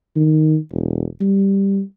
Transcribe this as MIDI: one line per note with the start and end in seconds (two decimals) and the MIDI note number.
0.16 0.57 51
0.71 1.06 28
1.20 1.82 55